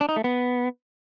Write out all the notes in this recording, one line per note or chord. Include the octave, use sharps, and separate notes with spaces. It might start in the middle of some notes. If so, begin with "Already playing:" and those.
D4
D#4
A3
B3